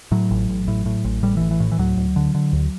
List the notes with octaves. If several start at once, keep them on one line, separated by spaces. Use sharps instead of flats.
A2 F#3
A1
A1
A2
A2
A1
A1 G3
A2 E3
E3
A2
E3
D2 F#3
D2
D3
D3
D2